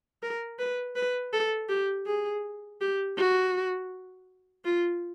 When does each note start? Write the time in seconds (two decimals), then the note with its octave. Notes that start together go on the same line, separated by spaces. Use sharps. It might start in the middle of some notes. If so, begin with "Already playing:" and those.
0.23 A#4
0.59 B4
0.96 B4
1.33 A4
1.69 G4
2.06 G#4
2.81 G4
3.17 F#4
4.65 F4